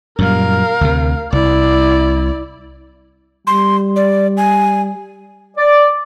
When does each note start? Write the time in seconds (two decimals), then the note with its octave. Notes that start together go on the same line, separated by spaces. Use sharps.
0.19 F#2 A#2 G3 A#4 F5
0.81 D2 C3
1.32 C2 E4 D5
3.47 G3 C6
3.96 D5
4.37 G#5
5.56 D5